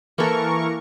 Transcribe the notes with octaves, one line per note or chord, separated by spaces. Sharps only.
E3 A#3 A4 A#4 C#6